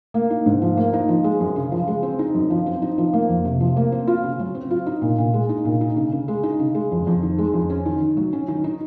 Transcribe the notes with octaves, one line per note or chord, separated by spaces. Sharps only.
A#3
D#4
G#2
F3
A#3
D#4
F3
G#3
F#2
C#3
F3
G#3
C4
D#4
F#2
F3
C4
D#4
F3
A#3
F2
C3
F3
A#3
C4
F4
C#3
F#3
C4
F4
D#4
A#2
A#2
G#3
D#4
A#2
D#4
C#3
C#3
G#3
D#4
C#3
G#3
F2
F2
D#3
G#3
F2
C#4
D#3
D#3
F#3
C#4
D#3
D#4